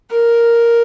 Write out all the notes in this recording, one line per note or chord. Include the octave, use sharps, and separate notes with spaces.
A#4